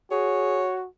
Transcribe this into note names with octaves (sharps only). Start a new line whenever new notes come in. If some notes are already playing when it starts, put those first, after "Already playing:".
F#4 G#4 C#5